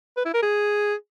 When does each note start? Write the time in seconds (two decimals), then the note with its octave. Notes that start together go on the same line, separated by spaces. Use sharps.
0.17 B4
0.25 E4
0.34 A#4
0.42 G#4